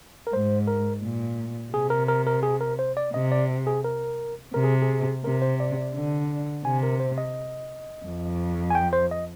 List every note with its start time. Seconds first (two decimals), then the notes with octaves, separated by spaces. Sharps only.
0.27 A#4
0.33 G#2 C5
0.67 A#4
1.03 A#2
1.73 C3 G#4
1.90 A#4
2.08 A#4
2.27 A#4
2.43 G#4
2.61 A#4
2.79 C5
2.97 D5
3.13 C3 D#5
3.32 D5
3.67 G#4
3.84 A#4
4.54 C3 A#4
4.64 G#4
4.82 G#4
5.24 C3 A#4
5.42 C5
5.60 D5
5.77 D5
5.95 D3
6.65 C3 G#5
6.83 A#4
7.00 C5
7.18 D#5
8.06 F2
8.71 G#5
8.75 G5
8.93 C5
9.11 D#5